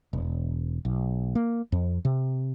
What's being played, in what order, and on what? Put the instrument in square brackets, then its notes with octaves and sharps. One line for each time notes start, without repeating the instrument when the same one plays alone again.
[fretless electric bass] E1
B1
A#3
F2
C3